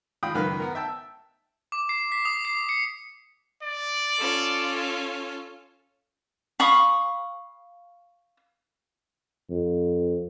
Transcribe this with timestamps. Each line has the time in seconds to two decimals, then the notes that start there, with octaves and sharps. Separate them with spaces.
0.23 G#1 F4 G5 B5 D#6
0.35 C#2 F#2 D#3 B4 B5 F6
0.60 B3 A#4
0.75 E5 G5 A5 E6
1.72 D6
1.89 C7
2.12 B6
2.25 D#6
2.45 C7
2.69 C#7
3.62 D5
4.18 C#4 F4 A4
6.60 F5 B5 C#6 D#6
9.50 F2